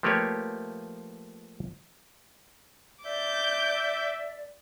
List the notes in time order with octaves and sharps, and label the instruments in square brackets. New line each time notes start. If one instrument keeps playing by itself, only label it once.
[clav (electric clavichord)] F3 A3 A#3 G4 B4 C#5
[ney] D5 [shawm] E5 [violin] D6 G6